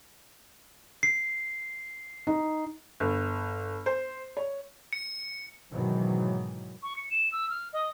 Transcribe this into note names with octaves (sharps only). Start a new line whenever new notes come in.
C7
D#4
G1
C5
C#5
C#7
G#2 B2 D#3 E3 F#3
C#6
C#7
E7
E6
F6
D#5